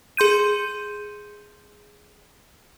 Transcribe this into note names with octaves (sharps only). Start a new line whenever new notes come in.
G#4 C6 G6 D#7